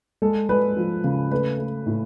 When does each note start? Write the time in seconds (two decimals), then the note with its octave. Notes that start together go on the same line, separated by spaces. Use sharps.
0.22 G#3 A4
0.49 G#3 B4
0.77 F3
1.04 C#3
1.31 A3 B4
1.59 A3
1.86 A2